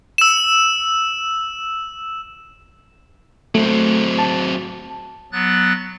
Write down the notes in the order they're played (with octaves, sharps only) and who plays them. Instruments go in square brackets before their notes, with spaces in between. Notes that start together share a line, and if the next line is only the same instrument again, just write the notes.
[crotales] E6 E7
[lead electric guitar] F#3 C4 [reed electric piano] A3
[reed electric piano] A5
[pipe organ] F#3 B3 F#6 A6